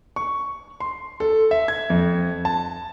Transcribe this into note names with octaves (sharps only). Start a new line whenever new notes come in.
C#6
C6
A4
E5
G#6
F2
A5